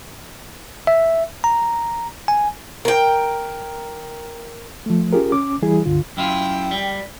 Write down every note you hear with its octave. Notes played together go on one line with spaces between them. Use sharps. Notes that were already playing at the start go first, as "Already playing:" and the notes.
E5
A#5
G#5
A#4 G5
F3 A3
C#4 F4 G4 G#4 A#4
C#4 D6
E3 G3 E4 G#4
C#2 G2 D3 F4
F#2 E4 F4 G5
G3